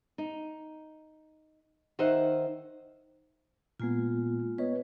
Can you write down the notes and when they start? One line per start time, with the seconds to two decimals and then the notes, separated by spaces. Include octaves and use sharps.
0.18 D#4
1.99 D#3 C5 D#5 E5 F#5
3.80 A#2 G#3 A#3 B3 F4
4.58 B3 B4 C#5 D#5